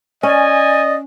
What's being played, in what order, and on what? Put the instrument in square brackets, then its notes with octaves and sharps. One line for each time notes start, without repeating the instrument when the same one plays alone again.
[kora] C#4 [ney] D5 [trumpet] D#5 [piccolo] G#5